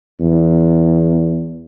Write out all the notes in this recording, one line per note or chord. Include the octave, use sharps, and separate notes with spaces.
E2